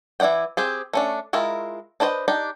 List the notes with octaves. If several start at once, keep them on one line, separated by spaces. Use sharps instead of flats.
E3 E4 D5 F#5 G5
C4 G4 G#4
A3 C#4 D4
G#3 E4 F4 A#4
D4 B4 C5 D5 D#5
D4 D#4 G4